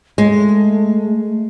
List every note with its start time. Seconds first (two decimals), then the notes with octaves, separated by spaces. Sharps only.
0.18 G#3 A3